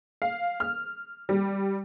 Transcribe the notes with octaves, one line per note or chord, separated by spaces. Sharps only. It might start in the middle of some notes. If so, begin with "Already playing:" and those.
F5
F6
G3